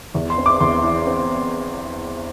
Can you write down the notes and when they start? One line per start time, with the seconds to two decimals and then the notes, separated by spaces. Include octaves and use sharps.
0.15 E2
0.30 C6
0.38 C4
0.46 D6
0.60 E2 C6
0.83 E3
1.07 C4